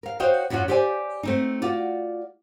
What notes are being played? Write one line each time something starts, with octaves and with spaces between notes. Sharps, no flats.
A#4 F5
F#4 C5 C#5 D#5 F5 G5
F#2 F#3 C#4 F4 F#4
G4 C5 D5 E5 F5 G#5
A3 C4 D#4
F4 F#4 D5